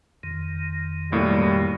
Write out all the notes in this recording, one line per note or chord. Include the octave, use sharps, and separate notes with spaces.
F2 D#3
B1 A2 G3 A#3